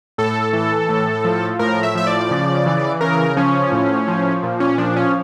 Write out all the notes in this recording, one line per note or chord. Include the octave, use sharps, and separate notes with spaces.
A2 A4
E3
A2
F3
A2 A#4
E5
F3 E5
D5
C#3
E3
C#3 A#4
F3 C#4
A2
F3
A#2
C#4
F3 D4
C#4